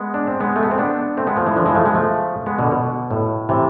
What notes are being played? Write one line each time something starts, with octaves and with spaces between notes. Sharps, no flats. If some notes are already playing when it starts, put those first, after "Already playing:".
Already playing: G#3 B3
D4
C4
G#3 B3
A3
B3
C4
B3 D4
A3 C4
G#3 B3
F3 A3
E3 G#3
D3 F3
E3 G#3
F3 A3
G#3 B3
F3 A3
G#3 B3
B2 D3
B2
A2
C3 E3